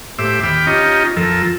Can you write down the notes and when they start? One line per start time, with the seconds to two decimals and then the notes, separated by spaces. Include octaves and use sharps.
0.18 A2 G4 C5 E5 D6 E6
0.43 D#2 G5 B5 D6 F6
0.67 C#4 D#4 F4 G4 D#5 A#5
1.17 F2 F3 A4 A#4 E6